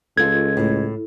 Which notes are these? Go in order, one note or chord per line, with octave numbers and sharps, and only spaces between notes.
C#2 F4 A4 G#6
A2